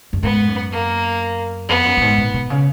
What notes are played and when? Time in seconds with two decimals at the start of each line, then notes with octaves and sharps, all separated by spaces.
0.13 F#2
0.23 G#2 B3
0.47 F#2
0.72 A#3
1.69 F2 B3
1.85 F#2
1.97 F#2
2.01 G#2
2.17 A#2
2.34 B2
2.50 C#3